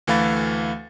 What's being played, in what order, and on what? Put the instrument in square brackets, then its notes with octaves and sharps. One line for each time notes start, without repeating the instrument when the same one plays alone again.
[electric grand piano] D2 E3 A3 F5 B5 A6